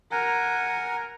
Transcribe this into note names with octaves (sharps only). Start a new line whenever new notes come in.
A#4 F#5 G#5